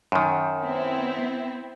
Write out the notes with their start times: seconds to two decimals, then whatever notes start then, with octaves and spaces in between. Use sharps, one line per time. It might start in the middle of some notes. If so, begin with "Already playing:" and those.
0.12 F#2 D#3
0.62 B3 C4 E4